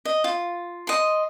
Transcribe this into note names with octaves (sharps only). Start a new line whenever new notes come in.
D#5
F4
D#5 C6